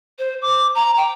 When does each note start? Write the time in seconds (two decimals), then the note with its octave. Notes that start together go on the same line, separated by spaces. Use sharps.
0.19 C5
0.42 D6
0.75 A#5
0.97 G5